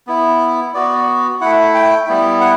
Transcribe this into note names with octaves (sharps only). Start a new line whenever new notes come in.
B3 E4
B3 F#4 D5
A3 E4 F#5
G5
G3 B3 E4
F#5